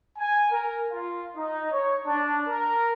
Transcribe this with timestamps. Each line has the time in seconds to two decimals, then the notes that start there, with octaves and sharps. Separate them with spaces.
0.18 G#5
0.51 A#4
0.91 F4
1.35 D#4
1.71 C#5
2.05 D4
2.47 A#4